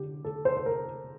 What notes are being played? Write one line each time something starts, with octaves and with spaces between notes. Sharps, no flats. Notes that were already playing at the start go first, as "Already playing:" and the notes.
Already playing: D3 G4
A4
C5
C5
A#4